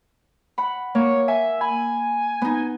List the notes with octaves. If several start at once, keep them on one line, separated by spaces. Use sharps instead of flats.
F#5 B5
A#3 C#5
E5 G#5
G#5 B5
B3 D#4